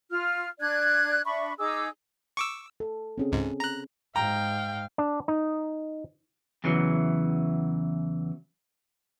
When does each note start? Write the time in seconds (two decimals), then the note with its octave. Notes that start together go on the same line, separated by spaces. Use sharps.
0.11 F4 F6
0.60 D4 D5 F#6 G#6
1.25 D4 E5 B5 C#6
1.58 D#4 G#4 D6 E6
2.37 C#6 D6 E6
2.80 A4
3.18 C4 C#4 G#4
3.32 C#2 G#2
3.60 A#5 F#6
4.16 G#2 F5 G5 A#5
4.98 D4
5.28 D#4
6.64 E2 C#3 E3 F#3